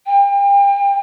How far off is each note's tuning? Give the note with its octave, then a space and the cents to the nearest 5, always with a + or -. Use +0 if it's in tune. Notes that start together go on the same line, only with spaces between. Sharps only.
G5 +35